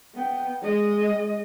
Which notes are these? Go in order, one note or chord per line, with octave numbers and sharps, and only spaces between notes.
B3 G5
G#3 D#5